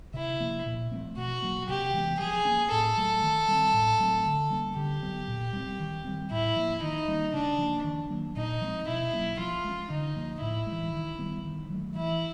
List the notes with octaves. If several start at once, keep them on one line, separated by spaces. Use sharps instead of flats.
C3 E4
F3 A#3
A#2
F3 A3 C4
B2 F#4
F#3 A#3
C3 G4
E3 G#3 B3
F3 G#4
A#3 C#4
A2 A4
F#3 A3
D#3
G3 C4
A2
F#3 A3 C4
D3
G3 A#3 C#4
D3 G4
F#3 B3
A#2
G3 C4
D#3
G3 C4
A2 E4
F3 A#3
D#3 D#4
G3 A#3 C#4
C#3 D4
F3 A#3
D#3
F#3 A#3
A#2 D#4
F3 G#3 C4
B2 E4
F#3 A#3 C#4
F3 F4
G#3 C#4
D3 D#4
F3 A#3
A2 E4
G#3
E3
D#3
G3 B3
D#3
F#3 A3
E3 E4